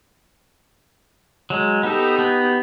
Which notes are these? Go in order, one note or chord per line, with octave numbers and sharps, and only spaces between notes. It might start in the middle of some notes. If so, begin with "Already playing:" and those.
F#3 G#3
B3 D#4 G4 A4
B3